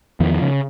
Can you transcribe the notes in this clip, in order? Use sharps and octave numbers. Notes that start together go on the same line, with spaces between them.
E2 D#3 F3
C#3